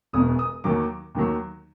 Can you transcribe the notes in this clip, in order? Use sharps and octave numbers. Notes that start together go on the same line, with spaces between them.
E1 E2 B2 D#6
D#6
D#2 D#3 F#3 D6
D#2 D#3 F#3